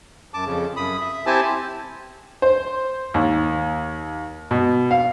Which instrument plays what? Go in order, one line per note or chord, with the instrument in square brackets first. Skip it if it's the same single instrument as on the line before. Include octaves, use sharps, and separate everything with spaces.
[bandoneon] F#2 A5 D6
F2 C#3
F#2 B5 D#6
E5
C4 E4 G4 C5 G#5 A5
[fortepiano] C5
D#2
B2
F5